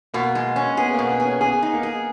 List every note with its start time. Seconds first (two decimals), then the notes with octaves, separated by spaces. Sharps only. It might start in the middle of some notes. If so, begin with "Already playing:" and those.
0.14 B2 A#3
0.35 G#3
0.56 C#4
0.77 B3 G#4
0.94 A#3
0.99 B2
1.09 B3
1.20 G#4
1.25 C#4
1.41 B3 G#4
1.62 D#4
1.74 A#3
1.83 G#4